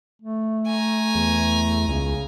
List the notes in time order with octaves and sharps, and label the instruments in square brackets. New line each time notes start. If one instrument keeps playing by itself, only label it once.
[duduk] A3
[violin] G#5 A#5
[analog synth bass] E2
[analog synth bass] C#2 [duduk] C#3